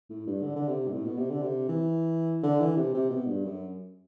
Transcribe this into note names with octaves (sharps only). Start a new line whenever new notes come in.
A2
G2
D3
D3
C3
G2
A2
B2
C3
D3
C3
E3
D3
E3
C3
C3
B2
G2
F#2